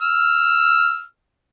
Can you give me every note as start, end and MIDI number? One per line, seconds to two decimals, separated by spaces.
0.02 1.04 88
0.02 1.04 89